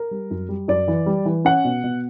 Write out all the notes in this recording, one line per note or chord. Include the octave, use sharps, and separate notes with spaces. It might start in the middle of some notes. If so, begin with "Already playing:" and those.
Already playing: A#4
G3
F#2
G3
F#2 D5
E3
G3
E3
C#4 F#5
B2
B2